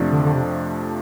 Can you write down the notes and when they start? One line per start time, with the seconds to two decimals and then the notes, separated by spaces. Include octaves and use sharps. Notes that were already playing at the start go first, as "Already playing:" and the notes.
Already playing: F2 C3 F3 A3 D4
0.12 D3
0.24 D3
0.34 C3